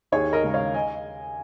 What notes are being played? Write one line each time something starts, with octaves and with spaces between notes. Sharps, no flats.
D#2 G#4 C#5
A#4 D#5
C#3 G#3
C#5 F5
D#5 G#5